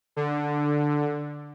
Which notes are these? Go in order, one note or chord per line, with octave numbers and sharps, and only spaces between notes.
D3